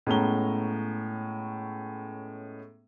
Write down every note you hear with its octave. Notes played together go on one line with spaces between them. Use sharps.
A2 G#3 B3 C#4 A#5 G7